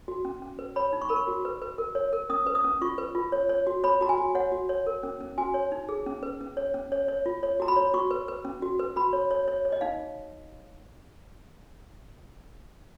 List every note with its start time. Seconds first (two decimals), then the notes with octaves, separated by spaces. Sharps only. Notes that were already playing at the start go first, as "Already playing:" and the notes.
0.08 F#4
0.25 C#4
0.42 C#4
0.59 B4
0.76 C#5 B5
0.93 D#4
1.02 C#6
1.09 A#4 B5
1.16 C#6
1.28 F#4
1.45 B4
1.62 B4
1.78 A#4
1.95 C#5
2.13 A#4
2.30 C#4 D#6
2.47 B4
2.55 D#6
2.64 C#4
2.82 F4 C#6
2.98 B4
3.15 F4
3.32 C#5
3.49 C#5
3.67 F#4
3.84 C#5 B5
4.01 F#4 A#5
4.09 G#5
4.18 F#4
4.35 C#5 F#5
4.52 F#4
4.69 C#5
4.87 A#4
5.03 C#4
5.21 C#4
5.38 F#4 G#5
5.54 C#5
5.72 D#4
5.89 G#4
6.06 C#4
6.23 B4
6.41 C#4
6.57 C#5
6.74 C#4
6.92 C#5
7.08 C#5
7.26 F4
7.43 C#5
7.60 F#4 A#5
7.68 B5
7.77 C#5
7.94 F#4 C#6
8.11 B4
8.28 B4
8.45 C#4
8.62 F#4
8.79 B4
8.96 F#4 B5
9.13 C#5
9.31 C#5
9.48 C#5
9.65 C#5
9.72 D#5
9.81 D#4 F5